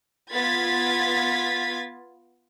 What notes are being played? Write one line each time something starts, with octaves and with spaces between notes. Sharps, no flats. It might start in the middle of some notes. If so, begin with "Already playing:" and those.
B3 F4 G#6 A6 B6